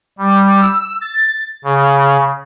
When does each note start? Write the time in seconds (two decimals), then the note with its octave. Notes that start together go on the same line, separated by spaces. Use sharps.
0.19 G3
0.61 E6
1.01 A6
1.64 C#3